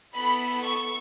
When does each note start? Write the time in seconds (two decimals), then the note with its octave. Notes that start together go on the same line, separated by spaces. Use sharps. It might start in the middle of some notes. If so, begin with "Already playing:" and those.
0.14 B3 E4 A4 B5
0.62 C#6